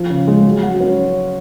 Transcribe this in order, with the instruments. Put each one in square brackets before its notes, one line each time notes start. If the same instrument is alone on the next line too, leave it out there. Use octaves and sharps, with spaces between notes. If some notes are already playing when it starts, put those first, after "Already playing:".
Already playing: [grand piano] F3
C#3
G#3
F#3
F#4
C#4